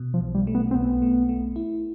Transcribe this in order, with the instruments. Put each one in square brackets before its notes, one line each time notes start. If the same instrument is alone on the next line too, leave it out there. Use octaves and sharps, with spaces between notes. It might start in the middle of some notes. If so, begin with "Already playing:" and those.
Already playing: [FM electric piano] B2
[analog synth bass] F3
[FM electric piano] B1
[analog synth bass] G3
[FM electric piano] A3
[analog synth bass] B3
C4
[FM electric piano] B1 [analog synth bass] B3
[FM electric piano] A3
A3
E4